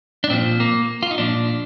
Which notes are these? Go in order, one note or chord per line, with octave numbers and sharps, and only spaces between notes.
D4
A#2 F3 C4
A#3
F4
D#4
A#2 F3 D4